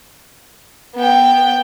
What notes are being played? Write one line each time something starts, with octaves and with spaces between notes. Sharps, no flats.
B3 G5